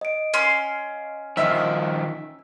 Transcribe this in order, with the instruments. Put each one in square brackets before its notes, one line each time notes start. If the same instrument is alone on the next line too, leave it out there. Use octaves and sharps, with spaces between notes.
[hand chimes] D#5 D7
[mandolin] C#4 F5 C6
[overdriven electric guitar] D#3 F3 [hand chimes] D#5 [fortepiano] E5